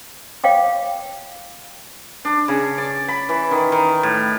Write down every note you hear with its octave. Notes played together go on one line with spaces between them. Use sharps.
C#5 F5 G5 D6
D4
C#3
D5
B5
E3
D#3
D#3
A2